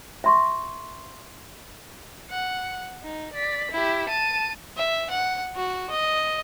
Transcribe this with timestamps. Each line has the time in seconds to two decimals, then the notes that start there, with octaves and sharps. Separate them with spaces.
0.24 E5 C6 C#6
2.30 F#5
3.03 D#4
3.34 D5 B6
3.72 E4 G4
4.09 A5 D#7
4.77 E5
5.10 F#5
5.56 F#4
5.90 D#5